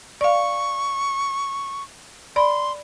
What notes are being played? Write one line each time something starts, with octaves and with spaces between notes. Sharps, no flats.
D5 F5 C#6
D5 B5 C6